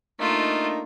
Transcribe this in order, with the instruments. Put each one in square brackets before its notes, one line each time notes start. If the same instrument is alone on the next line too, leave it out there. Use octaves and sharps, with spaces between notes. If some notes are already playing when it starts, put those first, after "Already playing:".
[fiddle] A3 F4 [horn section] A#3 D4 D#4